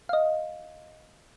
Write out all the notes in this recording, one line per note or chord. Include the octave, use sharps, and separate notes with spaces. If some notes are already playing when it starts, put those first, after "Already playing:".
D#5 F5